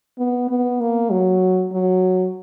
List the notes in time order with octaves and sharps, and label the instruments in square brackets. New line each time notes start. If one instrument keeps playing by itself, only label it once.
[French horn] B3
B3
A#3
F#3
F#3